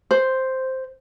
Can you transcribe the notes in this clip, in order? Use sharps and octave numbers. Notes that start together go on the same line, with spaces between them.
C5